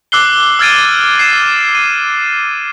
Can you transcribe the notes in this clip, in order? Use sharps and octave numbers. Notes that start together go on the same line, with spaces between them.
D6 E6 F#6 C7 G7
E6 F6 G#6 A6 D7 D#7
G#6 C7 E7
D#7